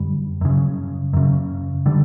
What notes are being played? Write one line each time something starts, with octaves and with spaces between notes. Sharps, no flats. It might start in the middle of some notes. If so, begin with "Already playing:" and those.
Already playing: F#2 D3 G3
F#2 C#3
F#2 C#3
D3 G3